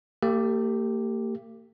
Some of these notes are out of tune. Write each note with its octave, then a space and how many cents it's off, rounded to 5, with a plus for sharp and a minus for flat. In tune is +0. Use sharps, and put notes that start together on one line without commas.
A#3 -40 G4 +0